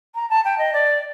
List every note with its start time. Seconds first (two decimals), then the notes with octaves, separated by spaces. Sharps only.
0.15 A#5
0.30 A5
0.45 G5
0.58 D#5
0.73 D5